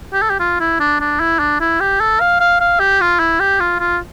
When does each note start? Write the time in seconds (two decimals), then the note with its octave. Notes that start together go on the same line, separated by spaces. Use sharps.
0.13 G4
0.22 A4
0.30 G4
0.40 F4
0.60 E4
0.80 D4
1.01 D4
1.20 E4
1.40 D4
1.60 E4
1.81 G4
2.01 A4
2.21 F5
2.40 F5
2.60 F5
2.80 G4
3.01 F4
3.20 E4
3.40 G4
3.60 F4
3.80 F4